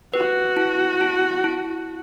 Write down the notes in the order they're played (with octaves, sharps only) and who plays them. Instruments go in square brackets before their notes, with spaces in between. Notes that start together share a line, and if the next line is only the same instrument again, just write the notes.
[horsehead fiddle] F#4 [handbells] B4
[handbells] E4
E4
E4